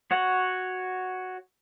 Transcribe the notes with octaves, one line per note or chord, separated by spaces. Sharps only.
F#4 C#5 F#5